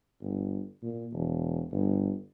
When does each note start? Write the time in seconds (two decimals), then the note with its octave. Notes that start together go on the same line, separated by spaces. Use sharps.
0.21 G1
0.83 A#2
1.12 E1
1.72 G1